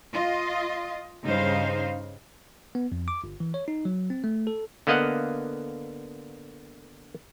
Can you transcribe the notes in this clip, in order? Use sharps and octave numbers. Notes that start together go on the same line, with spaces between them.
F4 D#5
G2 C#3 D#4 C5 F5
B3
F2
D6
G1
E3
C#5
D#4
F#3
C4
A3
A4
D3 A#3 B3 D#5 F5 F#5